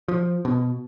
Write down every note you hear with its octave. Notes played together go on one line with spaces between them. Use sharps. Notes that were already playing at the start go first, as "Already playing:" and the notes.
F3
B2